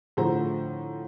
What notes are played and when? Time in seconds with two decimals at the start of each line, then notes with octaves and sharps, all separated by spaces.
0.17 A2 D3 F3 C5 A#5